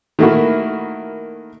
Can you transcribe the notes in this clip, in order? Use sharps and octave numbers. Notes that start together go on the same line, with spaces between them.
D#3 A3 A#3 E4 F#4